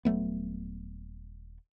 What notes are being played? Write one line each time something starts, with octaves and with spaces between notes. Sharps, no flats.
D#1 F#3 A3 B3